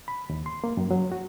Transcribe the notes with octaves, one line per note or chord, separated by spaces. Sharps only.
B5
D#2
C6
A#3
F#2
F#3
F#4